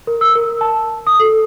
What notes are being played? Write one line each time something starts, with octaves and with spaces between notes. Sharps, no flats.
A#4
E6
A#4
A5
D#6
A4